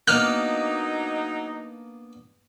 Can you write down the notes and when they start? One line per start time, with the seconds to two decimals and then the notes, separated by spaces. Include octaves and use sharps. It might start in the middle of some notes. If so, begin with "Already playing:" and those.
0.07 F#3 A#3 B3 D4 D#4 F6